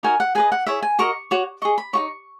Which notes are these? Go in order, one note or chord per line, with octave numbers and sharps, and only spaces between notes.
D#4 F#4 A#4 G#5
F#5
G#4 B4 D#5 G#5
F#5
E4 G#4 C#5 E5
G#5
F#4 A#4 D#5 C#6
F#4 C#5
G#4 D#5 C#6
B5
D#4 F#4 C#5 C#6